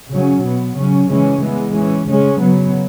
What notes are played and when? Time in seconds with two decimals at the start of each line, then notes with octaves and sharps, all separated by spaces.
0.11 C#3 F#3 C#4
0.44 B2 B3
0.76 C#3 F#3 C#4
1.09 C#3 E3 G#3 C#4
1.42 E3 G#3 B3
1.75 E3 C#4
2.07 C#3 G#3 C#4
2.40 C#3 F#3 B3